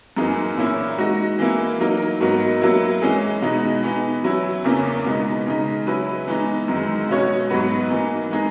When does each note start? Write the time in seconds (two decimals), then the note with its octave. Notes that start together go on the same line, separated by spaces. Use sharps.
0.16 F#2 E3 A#3 D#4 G#4
0.57 A#2 A#3 C#4 E4
0.98 G#3 D#4 F#4
1.39 E3 A#3 E4
1.80 F#3 A#3 D#4 A#4
2.20 G#2 F#3 B3 F#4 A#4
2.61 F#3 A#3 E4
3.02 E3 G#3 C#4 G#4
3.42 B2 G#3 B3 D#4
3.83 E3 B3 D#4
4.24 F#3 C#4 E4
4.65 E2 C#3 E3 A#3 C#4
5.06 B2 G#3 B3 D#4
5.47 C#3 G#3 D#4
5.87 F#3 C#4 E4 B4
6.28 E3 G#3 B3 D#4
6.68 F#2 D#3 G#3
7.09 B2 G#3 C#4 F#4 C#5
7.50 G#2 F#3 B3 F#4 B4
7.90 E3 A#3 D#4
8.31 G#3 B3 D#4 G#4